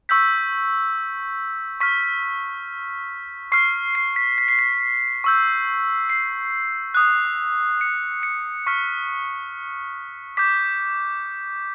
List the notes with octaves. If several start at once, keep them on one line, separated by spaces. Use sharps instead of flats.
C#6 E6 G6 B6
C#6 F6 B6
C#6 F6 C7
C7
B6
B6
C7
B6
C#6 E6 G6
C7
D#6 F#6
C#7
C#7
C#6 F6 B6
D6 G6 B6